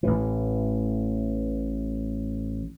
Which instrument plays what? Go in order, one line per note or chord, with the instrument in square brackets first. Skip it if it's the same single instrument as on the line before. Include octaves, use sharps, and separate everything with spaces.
[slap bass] A1 A2 E3